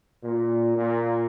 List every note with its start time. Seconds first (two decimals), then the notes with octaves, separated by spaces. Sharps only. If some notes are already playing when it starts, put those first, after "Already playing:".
0.23 A#2
0.77 A#2